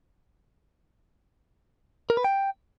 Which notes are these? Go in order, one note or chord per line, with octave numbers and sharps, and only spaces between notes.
A#4
B4
G5